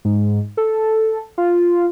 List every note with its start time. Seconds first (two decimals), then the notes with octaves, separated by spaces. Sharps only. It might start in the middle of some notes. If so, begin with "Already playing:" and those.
0.05 G#2
0.57 A4
1.38 F4